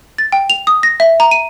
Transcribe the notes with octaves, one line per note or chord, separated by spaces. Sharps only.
A6
G5
F7
D#6
A#6
E5
A#5
D#7